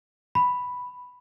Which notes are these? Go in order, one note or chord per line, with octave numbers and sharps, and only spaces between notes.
B5